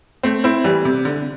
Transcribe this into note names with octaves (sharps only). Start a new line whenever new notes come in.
A3 C4
C4 E4
E3 G3
C3
D3